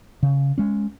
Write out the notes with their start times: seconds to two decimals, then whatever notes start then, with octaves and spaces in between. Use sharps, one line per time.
0.23 C#3
0.58 G#3 C#4